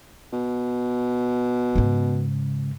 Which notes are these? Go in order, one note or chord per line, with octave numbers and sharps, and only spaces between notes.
B2
G#2 C#3